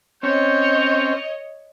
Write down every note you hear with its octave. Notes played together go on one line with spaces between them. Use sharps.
C4 C#4 C#5 D#5 G6